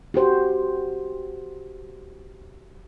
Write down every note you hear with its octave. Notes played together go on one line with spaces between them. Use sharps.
F#4 G4 C5